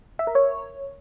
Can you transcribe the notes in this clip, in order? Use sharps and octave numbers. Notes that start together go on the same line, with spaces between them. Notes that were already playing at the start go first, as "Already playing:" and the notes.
E5
A#4
C#5